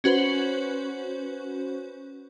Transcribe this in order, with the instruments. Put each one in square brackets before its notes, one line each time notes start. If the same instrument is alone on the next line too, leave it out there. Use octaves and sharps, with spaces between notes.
[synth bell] C#4 F#4 B4 C5